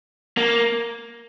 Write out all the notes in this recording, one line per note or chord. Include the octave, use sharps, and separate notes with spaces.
A#3